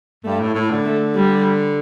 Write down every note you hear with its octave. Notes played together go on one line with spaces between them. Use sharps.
G2 A3
A2
A2 A3
D3
A3
G3